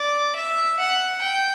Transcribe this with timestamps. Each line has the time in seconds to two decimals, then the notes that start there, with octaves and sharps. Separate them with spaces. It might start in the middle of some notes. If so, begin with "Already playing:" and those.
Already playing: D5
0.35 E5
0.79 F#5
1.21 G5